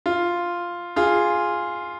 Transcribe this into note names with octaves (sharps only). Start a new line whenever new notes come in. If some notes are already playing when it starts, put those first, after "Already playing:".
F4
F4 G#4